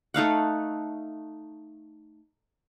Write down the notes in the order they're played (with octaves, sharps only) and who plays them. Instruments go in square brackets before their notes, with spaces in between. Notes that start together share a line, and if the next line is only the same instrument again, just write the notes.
[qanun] A3 D#4 F5 F#5